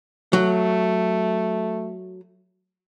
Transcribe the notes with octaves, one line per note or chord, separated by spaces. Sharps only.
F#3 A3